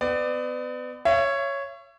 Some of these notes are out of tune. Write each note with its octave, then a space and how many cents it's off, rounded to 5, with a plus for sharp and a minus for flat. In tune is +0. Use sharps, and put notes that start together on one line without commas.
B3 +35 D5 +25
C#5 +0 E5 +40